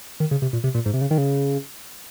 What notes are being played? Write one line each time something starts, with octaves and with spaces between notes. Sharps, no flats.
D#3
C#3
C3
A#2
C3
A#2
G#2
C3
C#3
D#3
C#3